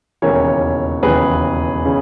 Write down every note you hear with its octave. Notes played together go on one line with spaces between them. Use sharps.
E1 D#2 C#3 E3 A#4 C#5
E1 D#2 C#3 E3 G#4 B4
C#3 E3